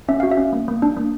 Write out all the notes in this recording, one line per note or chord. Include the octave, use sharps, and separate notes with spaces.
C#4 E5
F#4 F5
E5
C#4
A#3
A#3
D4
A#3